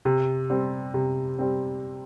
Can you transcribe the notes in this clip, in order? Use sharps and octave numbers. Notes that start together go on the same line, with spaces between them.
C3
G3 C4
C3
G3 C4